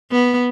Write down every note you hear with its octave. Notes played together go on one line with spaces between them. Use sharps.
B3